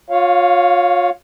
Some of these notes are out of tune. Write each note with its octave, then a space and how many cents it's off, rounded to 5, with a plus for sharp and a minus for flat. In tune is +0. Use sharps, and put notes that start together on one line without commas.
F4 +35 C#5 +0 F5 +0